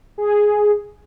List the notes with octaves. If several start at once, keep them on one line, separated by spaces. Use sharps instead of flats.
G#4